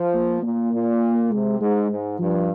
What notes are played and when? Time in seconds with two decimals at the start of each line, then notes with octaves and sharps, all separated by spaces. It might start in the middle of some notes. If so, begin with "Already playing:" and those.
Already playing: F3
0.13 A#3
0.43 A#2 A#3
0.72 A#2
1.31 C3 G#3
1.60 G#2 G#3
1.90 G#2
2.19 G2 F3